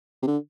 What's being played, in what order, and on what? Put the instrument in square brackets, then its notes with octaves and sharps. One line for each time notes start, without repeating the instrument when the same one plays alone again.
[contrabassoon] C3
D3